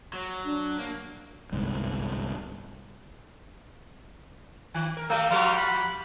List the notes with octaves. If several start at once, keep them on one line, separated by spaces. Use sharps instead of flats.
F#3
D4
A#3
G1 C2 G#2
D#3
A#4
G3 A3 G5 E6
F3 G3 F#4 F5 C6
B5 F#6